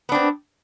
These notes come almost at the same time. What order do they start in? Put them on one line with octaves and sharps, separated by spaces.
B3 D4 C4